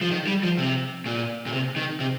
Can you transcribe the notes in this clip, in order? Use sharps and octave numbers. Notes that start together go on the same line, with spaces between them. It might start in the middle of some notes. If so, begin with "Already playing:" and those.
F3
D#3
G3
F3
C3
A#2
A#2
C3
D#3
C3